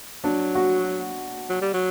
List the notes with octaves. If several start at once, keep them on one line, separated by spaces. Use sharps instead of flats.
F#3 D4
F#4
F#3
G3
F#3